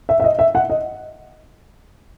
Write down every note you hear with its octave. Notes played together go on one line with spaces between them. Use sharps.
E5
E5
D#5
E5
F#5
D#5